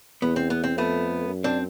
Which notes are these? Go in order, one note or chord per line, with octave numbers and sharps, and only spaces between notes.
E2 B3
C4
B3
C4
F2 A3 B3
F#2
C4 D4